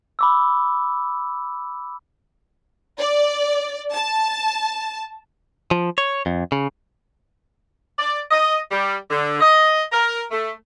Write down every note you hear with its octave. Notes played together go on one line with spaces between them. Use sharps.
B5 D6 E6
D5
A5
F3
C#5
F2
C#3
D5
D#5
G3
D3
D#5
A#4
A3